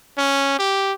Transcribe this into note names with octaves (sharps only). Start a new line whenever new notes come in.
C#4
G4